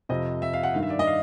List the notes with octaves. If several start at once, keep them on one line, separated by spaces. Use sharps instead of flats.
F2 C3 F3 D#5
E5
F5
F#5
G2 D#3 F5
E5
D5
D#5
F5